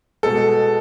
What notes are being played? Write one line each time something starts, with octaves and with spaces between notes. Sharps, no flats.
B2 G#3 A4